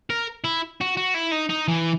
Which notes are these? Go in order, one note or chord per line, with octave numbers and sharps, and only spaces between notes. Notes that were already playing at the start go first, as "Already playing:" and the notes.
A#4
E4
F#4
F#4
E4
D#4
D#4
E3